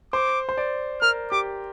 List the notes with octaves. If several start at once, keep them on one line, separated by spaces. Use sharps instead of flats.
C5 D6
C5
D5
A#4 F6
G4 D6